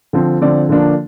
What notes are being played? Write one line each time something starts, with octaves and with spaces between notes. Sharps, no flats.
D3 F3 C4
D3 F3 C4 D5
D3 F3 A#3 D4